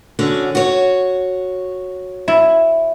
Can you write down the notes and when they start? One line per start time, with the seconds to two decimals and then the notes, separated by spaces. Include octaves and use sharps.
0.19 D3 C#4 F#4
0.55 F#4 C#5
2.28 E4